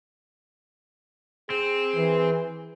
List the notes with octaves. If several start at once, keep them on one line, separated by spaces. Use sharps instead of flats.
C4 G#4
E3